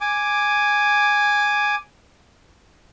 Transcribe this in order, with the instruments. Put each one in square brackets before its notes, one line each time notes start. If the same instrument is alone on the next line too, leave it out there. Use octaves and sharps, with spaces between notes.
[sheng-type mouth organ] G#5 D6